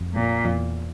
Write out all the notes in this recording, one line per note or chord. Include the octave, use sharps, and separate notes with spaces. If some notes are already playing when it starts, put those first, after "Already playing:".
Already playing: F2
A#2
F2
E2